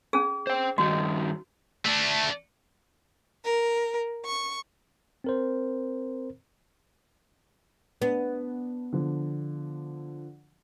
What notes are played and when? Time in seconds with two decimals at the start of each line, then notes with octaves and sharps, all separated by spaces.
0.13 C#4 G#4
0.47 C5 G5
0.78 G2 D#3 D#4 F#4
1.86 A3 D4
3.44 A#4
4.26 C#6
5.24 C4 A#4 C5
8.02 B3 D4
8.93 D3 F3